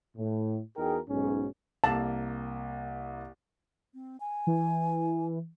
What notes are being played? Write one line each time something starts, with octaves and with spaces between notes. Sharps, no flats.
A2
E2 D#4 F#4 G#4 A#4 G5
B1 G#2 C#4
C2 A#3 A5
C4
G#5
E3